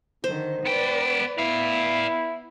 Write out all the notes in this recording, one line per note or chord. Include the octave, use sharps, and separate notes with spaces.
D3 D#3 C5
B3 B4 D5 G5
B3 E4 D5 F5